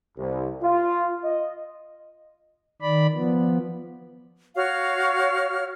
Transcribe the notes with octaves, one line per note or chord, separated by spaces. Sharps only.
C2
F4
D#5
D#3 D5 B5
F3 B3
F#4 C#5 F5 F6